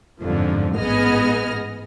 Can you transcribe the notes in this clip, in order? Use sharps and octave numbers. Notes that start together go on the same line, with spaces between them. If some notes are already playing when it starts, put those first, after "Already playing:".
G1 F2 G#2 D3 F3
A1 G#2 B3 G#4 D#5 F6